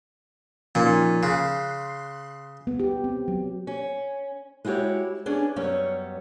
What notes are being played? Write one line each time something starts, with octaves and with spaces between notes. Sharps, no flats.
A#2 F3 C#4 D#4
C#3 C6 F#6 C7
B3
G4
C4
F#3
C#4
G#3 E4 F#4 G4 C#5
B3 C#4 D4 G#4
F#2 G3 B3 C#4 C#5